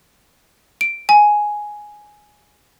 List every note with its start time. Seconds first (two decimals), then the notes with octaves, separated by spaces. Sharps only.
0.81 D7
1.09 G#5